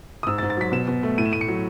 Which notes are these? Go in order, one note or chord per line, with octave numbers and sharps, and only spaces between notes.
D#6
G#2 E6
A6
G#2
A6
F#3 B6
B2 E7
B2
A3
A2 D#7
E7
A2 D#7
C#7
F#3